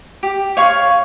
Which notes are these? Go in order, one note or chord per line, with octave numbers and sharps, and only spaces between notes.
G4
C#5 F5 C#6